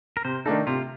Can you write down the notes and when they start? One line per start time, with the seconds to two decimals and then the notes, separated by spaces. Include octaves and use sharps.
0.17 A#4
0.25 C3 C5
0.46 D#3 A3 D4 D#4 A4
0.67 C3 F4